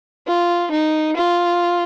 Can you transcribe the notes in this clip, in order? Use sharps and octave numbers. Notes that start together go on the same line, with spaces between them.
F4
D#4
F4